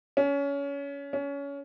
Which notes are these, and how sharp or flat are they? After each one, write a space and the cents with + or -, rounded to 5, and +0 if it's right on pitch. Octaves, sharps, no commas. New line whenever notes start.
C#4 +25
C#4 +25